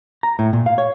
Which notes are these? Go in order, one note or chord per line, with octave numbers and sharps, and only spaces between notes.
A#5
A2
A#2
F5
C#5